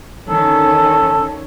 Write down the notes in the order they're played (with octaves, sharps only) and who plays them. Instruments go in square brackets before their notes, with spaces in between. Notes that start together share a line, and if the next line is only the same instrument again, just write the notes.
[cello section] D3 D#3 C#4 [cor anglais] A4